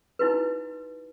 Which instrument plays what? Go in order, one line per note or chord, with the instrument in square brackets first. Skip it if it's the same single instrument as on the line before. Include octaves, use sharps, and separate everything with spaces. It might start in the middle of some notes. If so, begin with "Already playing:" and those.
[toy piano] D#4 E4 F#4 B4